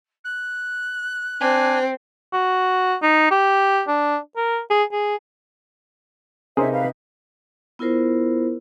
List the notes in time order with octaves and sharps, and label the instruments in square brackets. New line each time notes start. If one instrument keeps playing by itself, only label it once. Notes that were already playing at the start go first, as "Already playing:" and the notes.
[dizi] F#6
[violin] C4 [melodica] D4 G#5
[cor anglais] F#4
D#4
G4
D4
A#4
G#4
G#4
[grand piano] C3 D#4 [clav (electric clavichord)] G#4 A#4 C5 [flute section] C#5 E5
[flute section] B4 F5
[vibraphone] B3 E4 F4 A#4 C5